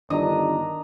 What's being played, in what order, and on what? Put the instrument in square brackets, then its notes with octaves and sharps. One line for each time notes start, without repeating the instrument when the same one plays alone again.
[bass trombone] G1 [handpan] D#3 D4 [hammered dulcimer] D#5 A#5